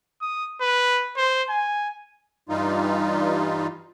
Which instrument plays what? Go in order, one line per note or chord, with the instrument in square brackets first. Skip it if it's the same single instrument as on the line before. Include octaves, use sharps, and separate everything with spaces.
[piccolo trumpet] D#6
B4
C5
G#5
[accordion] G2 E3 G3 D#4 F4